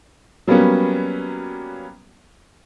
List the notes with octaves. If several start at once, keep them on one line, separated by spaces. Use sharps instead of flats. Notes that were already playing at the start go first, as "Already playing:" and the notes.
F#3 G3 A#3 B3 C#4